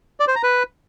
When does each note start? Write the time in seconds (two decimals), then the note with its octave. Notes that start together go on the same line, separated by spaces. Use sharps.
0.20 D5
0.28 C5
0.35 A#5
0.43 B4